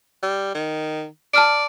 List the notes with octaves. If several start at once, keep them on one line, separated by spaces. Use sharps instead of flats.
G3
D#3
D5 A5 F6 D7